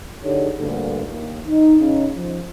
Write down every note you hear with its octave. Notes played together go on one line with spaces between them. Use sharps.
D3 D#4 G4 G#4 C#5
D2 G2 A#2 D3
D#2
D#4
C#3 D#4
F3